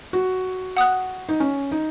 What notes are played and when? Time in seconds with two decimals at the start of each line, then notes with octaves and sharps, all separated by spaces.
0.13 F#4
0.77 F#5 D#6 F#6
1.29 D#4
1.40 C#4
1.71 D#4